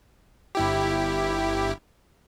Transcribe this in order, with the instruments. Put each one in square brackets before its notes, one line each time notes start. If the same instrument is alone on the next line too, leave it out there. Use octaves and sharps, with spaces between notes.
[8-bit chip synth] G1 E4 G4